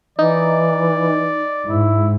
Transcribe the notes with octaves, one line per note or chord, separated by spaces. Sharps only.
E3 D#4 D5
G#2 E4